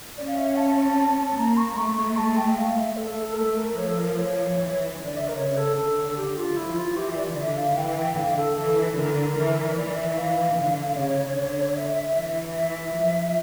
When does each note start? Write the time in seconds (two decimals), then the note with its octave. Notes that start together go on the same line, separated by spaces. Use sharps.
0.17 C#4 D5
0.27 F5
0.37 E5
0.47 F5
0.57 A5
1.29 A5
1.36 A#3 A#5
1.51 A#5
1.57 C#6
1.71 A#5
1.77 A3 C#6
1.97 C#6
2.17 A5
2.37 G5
2.57 F5
2.77 E5
2.97 A4
3.10 A4
3.23 A4
3.33 A#4
3.37 A3 A4
3.57 A#4
3.77 F3 C#5
3.88 A4
3.97 A#4
4.17 C#5
4.57 E3
4.97 D3
5.05 D5
5.17 E5
5.28 A#4
5.37 C#3 C#5
5.57 A4
5.77 D3 A4
6.17 G4
6.37 F4
6.57 F3 E4
6.76 F4
6.97 E3 G4
7.11 E5
7.17 D5
7.36 D3 E5
7.57 F5
7.77 E3 G5
8.17 D3 F5
8.37 A4
8.57 E3 A4
8.96 D3 A#4
9.36 E3
9.72 E5
9.77 E3 D5
9.97 E5
10.17 F5
10.57 D3
10.97 C#3 C#5
11.37 D3
11.71 D5
11.77 E5
12.16 E3
12.57 E5
12.96 F3